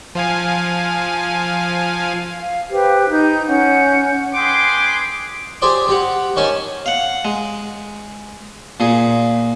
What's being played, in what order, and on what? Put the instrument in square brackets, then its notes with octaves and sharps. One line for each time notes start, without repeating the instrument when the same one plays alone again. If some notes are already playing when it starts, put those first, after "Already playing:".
[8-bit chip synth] F3 F5 G#5
[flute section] F5
G4 B4 C5
D#4 G6
C#4 F#5 G6
[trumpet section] G#4 B4 G5 C6 D6
[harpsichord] G4 G#4 C5 D5 G5
C4 G4 F#5
D#3 C#4 G#5 A5
F5 F#5
G#3
A#2 G#4